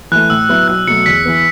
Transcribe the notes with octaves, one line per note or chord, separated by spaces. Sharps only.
E3 A3 F#6
A2 E6
F#3 B3 E4
B1 F#6
B2 F#3 A3 C#7
E2 B6
E3 B3